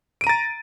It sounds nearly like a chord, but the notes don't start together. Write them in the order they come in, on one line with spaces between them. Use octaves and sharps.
D7 D#7 A#5 A6